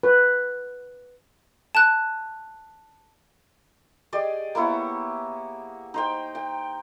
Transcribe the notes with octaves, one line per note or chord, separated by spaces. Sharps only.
B4
A5 F#6
G4 G#4 D5 D#5
A#3 B3 E4 C#5
D#4 C5 G5
G5